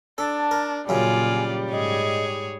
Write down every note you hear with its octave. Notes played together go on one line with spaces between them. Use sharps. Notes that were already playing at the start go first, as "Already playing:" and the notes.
D4 A4 A5
A#4
F#2 A#2 C#3 G3 F4 D5 G#5
G#2 G#4 C#5 D#5